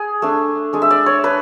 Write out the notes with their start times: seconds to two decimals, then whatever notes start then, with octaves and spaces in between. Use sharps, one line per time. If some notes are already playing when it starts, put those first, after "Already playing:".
Already playing: G#4
0.22 A3 D4
0.73 G#3 D4
0.82 E5
0.91 D5
1.06 C#5
1.24 D4 B4